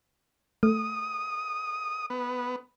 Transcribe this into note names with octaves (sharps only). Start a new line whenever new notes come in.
A3 D#6
B3